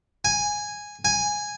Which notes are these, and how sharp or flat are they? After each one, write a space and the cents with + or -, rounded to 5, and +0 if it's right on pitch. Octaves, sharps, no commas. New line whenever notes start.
G#5 -5
G#5 -5